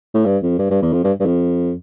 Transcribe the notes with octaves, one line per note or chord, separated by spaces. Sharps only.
A2
G2
F2
G2
G2
E2
F2
G2
G2
F2